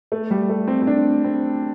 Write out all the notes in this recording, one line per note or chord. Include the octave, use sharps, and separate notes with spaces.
A3
G3
A3
C4
C4
D4
C4